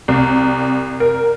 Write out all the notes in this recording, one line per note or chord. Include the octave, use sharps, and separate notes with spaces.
C2
A#4